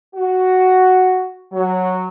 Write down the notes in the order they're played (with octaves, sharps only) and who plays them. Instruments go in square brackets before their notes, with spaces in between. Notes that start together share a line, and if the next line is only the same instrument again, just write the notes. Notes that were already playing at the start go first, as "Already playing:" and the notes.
[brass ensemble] F#4
F#3